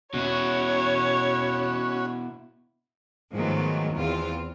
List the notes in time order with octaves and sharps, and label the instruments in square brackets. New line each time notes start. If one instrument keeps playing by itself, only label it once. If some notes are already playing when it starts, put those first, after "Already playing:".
[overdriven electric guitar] B2 E4 [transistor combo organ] C#4 F#4 [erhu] C#5
[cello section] G#2 D#3 F3 F#3 A3 B3
E2 C4 F4